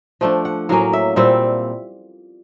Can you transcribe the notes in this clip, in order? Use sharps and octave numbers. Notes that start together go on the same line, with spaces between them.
F3 A3 D4 G5
F#5
A2 F#3 A#3 C#4 F5
E5
A#2 G3 C4 E5